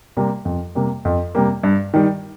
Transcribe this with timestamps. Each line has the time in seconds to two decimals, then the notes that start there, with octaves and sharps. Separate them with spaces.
0.17 C3 G3 A#3
0.45 F2
0.75 C3 G3 A#3
1.05 F2
1.35 C3 G3 A#3
1.63 G2
1.94 D#3 G3